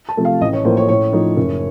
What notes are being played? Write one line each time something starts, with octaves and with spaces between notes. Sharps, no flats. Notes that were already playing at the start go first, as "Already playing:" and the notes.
A5
C3 F3 A3
F5
A1 D#5
C#5
A2 F3 A#3 C5
C#5
A2 C#5
F3 A3 D#4
F#1